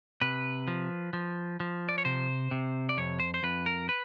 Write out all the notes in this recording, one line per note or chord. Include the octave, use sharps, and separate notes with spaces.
C3 B4
F3
F3
F3
D5
C#5
C3 C5
C3
D5
F2 C#5
C5
C5
F2 B4
A#4
B4